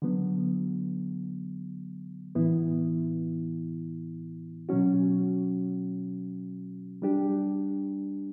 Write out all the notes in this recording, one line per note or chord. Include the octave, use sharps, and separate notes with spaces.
D3 F#3 B3
A2 E3 B3 E4
B2 F#3 C#4 F#4
G3 D4 G4